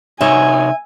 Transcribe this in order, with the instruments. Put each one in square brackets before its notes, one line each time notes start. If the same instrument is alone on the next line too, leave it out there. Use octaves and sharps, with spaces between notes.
[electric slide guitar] C3 D#4 C#5 [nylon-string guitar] E5 [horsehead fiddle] G#5